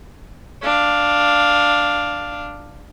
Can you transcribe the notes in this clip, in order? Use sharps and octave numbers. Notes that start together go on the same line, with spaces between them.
D4 F5